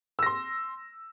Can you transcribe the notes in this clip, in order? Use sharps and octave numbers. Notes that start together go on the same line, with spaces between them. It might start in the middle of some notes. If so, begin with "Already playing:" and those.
C6 E6 A#6